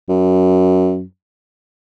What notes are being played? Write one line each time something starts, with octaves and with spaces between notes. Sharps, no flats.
F#2